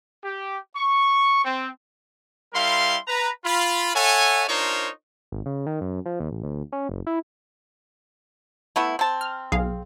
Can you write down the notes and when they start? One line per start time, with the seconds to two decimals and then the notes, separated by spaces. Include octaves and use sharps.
0.23 G4
0.76 C#6
1.44 C4
2.54 G3 E4 A#4 F5 C6
3.07 B4 A#5
3.45 F4 B5
3.95 A4 C#5 E5 F#5 G#5
4.48 D4 D#4 F4 A#4 C5 C#5
5.32 G#1
5.46 C#3
5.66 D#3
5.81 F#2
6.06 F3
6.20 D#2
6.31 A1
6.43 D2
6.72 C#4
6.89 F#1
7.07 E4
8.76 A3 B3 E4
8.99 C4 A5
9.21 F6
9.52 B1 G#4 F5